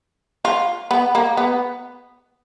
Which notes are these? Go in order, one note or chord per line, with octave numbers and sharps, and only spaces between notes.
F4
B3
A#3
B3